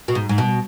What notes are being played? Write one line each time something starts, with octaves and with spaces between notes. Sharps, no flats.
B2
G#2
G#2
B2